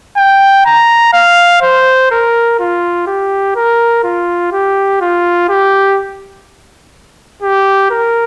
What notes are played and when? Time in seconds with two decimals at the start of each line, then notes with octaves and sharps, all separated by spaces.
0.17 G5
0.66 A#5
1.13 F5
1.62 C5
2.11 A#4
2.59 F4
3.07 G4
3.56 A#4
4.04 F4
4.52 G4
5.01 F4
5.49 G4
7.42 G4
7.90 A#4